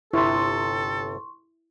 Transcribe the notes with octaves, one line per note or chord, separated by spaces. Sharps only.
G1 C3 E4 A4 C6 C#6